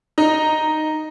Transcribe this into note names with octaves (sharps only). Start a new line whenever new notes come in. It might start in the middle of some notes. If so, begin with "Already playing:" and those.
D#4